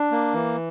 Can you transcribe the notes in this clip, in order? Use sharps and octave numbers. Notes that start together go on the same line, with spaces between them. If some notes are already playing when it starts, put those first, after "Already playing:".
Already playing: D4
A#3
E3